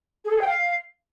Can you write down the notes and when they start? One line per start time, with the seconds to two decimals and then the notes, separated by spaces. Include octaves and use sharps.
0.23 G#4
0.29 A4
0.35 G#4
0.40 G5
0.46 F5